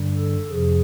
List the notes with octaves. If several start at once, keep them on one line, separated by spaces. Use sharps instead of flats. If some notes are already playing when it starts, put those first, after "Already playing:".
Already playing: G2 D3 G3
A4
F2 C3 F3 G#4